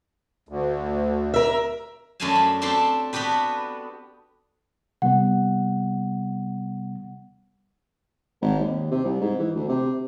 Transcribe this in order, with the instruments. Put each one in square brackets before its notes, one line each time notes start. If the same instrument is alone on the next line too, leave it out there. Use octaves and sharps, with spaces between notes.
[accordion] D2
[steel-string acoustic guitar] A#4 E5
[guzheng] F#2 A3 D4 F5 G#5 A5
B5
C4 D4 G4 A4 A5 C6
B3 D4 F#4 G4 B4
[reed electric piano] C3 G3 B3 [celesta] F#5
[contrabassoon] G#1
D#2
C3
C2
G#2
E3
D2
C3